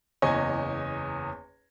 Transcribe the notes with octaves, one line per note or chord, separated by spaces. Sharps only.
F#1 E2 C#5 D#5 G#5